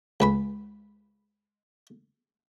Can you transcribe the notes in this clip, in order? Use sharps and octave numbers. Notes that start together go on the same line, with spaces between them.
C#2 B4 B5